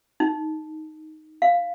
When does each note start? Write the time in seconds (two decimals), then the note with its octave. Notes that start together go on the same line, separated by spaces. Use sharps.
0.20 D#4
1.42 F5